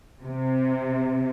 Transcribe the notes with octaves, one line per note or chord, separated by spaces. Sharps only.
C3